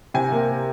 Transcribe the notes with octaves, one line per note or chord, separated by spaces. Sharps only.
C3 G#5
A#3
A#3